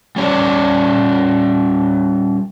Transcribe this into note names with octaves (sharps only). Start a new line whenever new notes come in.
G3 C#4 C#5 D5